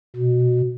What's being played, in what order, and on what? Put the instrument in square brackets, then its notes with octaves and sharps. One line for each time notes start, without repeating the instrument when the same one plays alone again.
[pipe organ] B2